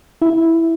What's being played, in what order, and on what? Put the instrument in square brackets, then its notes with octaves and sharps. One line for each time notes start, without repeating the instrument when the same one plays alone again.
[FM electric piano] E4